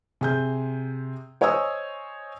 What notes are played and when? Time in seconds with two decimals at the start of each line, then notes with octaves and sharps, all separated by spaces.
0.21 C3 G#4 G6
1.41 C5 C#5 D#5 G#5 D#6 E6